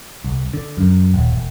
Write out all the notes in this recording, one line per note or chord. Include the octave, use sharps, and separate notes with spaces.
C2
D3
F#2
D#1
E1